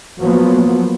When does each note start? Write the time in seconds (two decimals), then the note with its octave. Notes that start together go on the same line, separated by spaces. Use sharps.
0.20 F3 F#3 A#3 B3